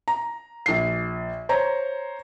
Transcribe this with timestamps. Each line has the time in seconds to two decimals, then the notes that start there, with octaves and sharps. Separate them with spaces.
0.08 A#5
0.66 A#1 C7
1.49 C5 C#5 A#5